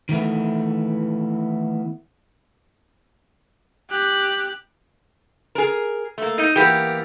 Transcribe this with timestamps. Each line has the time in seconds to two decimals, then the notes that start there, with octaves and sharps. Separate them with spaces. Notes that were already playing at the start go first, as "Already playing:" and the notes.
0.09 D#3 E3 A3 B3
3.90 G4 F#6
5.55 G#4 A#4
6.18 A3 A#3
6.38 D#4
6.56 E3 A#3 B3 G4